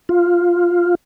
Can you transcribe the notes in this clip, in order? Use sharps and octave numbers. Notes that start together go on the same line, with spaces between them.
F4